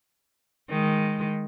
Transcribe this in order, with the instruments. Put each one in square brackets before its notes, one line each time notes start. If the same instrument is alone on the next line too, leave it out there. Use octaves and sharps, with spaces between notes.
[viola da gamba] D#3 G#3